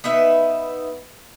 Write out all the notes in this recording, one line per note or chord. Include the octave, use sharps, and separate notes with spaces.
B3 D#4 B4 E5